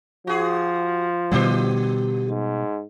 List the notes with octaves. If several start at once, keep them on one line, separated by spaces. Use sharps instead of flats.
F3 F#4 G#4
B2 D3 G3 G4 C5
G#2